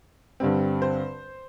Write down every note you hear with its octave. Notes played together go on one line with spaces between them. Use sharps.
G2 D3 G3 C4
C5